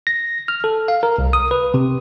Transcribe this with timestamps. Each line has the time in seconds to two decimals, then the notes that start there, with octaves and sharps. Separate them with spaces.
0.07 A#6
0.48 F6
0.64 A4
0.88 F5
1.03 A#4
1.18 C2
1.33 D#6
1.51 B4
1.74 C3